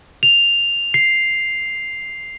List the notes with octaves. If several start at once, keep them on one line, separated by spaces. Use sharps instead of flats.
F7
C7